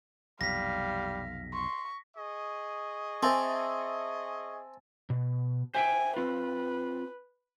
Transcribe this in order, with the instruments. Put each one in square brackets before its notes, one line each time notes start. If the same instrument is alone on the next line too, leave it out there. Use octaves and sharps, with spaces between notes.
[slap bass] B1 F2 C3 [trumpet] G3 [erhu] F5 [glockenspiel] A#6 B6
[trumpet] C6 [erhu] C#6
[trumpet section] G#4 D#5 C#6
[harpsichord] C4 [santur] E5 G#5 A5
[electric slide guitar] B2
[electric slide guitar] C5 E5 G5 [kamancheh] G#5
[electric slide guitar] C4 F4 [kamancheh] B4